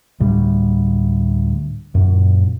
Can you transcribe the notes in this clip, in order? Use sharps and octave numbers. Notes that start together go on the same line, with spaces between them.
D2 A2 G3
F#2 A#2